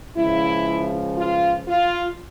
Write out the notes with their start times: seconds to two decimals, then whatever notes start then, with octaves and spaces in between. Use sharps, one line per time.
0.16 C#2 C#3 F3 E4
1.18 F4
1.68 F4